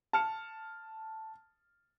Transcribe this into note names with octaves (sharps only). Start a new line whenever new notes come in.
A5 F6 C#7